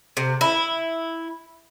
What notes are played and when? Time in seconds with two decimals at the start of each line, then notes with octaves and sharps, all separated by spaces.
0.17 C3
0.41 E4